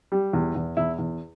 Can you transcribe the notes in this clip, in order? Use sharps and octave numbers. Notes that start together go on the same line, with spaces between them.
G3
E2
E2
E2 E4
E2